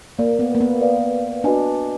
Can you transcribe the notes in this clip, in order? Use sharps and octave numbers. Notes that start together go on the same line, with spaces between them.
A#3 A#4 D5 F5
B3
A#3
B3
B4 D5 F5
D4 F#4 B4 D#5 G#5